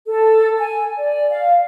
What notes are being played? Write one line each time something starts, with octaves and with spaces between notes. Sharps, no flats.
A4
G#5
D5
F5